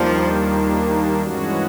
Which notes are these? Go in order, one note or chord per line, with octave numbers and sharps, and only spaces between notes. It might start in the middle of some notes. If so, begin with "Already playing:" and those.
Already playing: D#2 D#3 F3 G3 A#3 D4
G2 E3 G#3 C#4 F#4